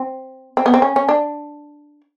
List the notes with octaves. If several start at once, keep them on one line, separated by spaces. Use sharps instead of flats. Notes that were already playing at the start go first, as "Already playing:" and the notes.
Already playing: C4
C4
B3
C4
C#4
C#4
D4